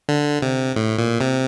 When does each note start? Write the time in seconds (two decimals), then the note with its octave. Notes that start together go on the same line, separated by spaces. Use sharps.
0.09 D3
0.42 C3
0.76 A2
0.98 A#2
1.21 C3